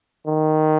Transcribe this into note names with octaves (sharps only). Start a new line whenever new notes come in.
D#3